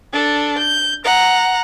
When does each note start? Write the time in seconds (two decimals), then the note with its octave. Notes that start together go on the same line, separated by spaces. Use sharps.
0.13 D4 A4
0.58 G6
1.04 F#5 A#5